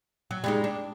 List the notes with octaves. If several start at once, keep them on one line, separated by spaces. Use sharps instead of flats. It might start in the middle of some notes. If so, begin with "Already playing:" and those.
F#3
G3 G#3 D#4
D4